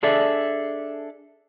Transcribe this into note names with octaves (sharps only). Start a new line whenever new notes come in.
D4 G#4 A4 D5 E5